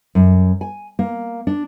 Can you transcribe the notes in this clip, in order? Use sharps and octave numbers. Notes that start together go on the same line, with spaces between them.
F#2
G#5
A#3
D4